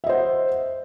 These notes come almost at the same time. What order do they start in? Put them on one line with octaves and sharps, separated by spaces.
E5 D#5 C5 F#5